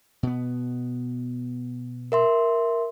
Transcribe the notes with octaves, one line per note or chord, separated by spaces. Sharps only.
B2 B3
A#4 E5 C6